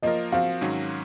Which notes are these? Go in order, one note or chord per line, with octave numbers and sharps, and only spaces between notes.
F3 A#3 F4 A#4 D#5
F3 C4 F#4 F5
G#2 D#3 F#3 C#4 F#4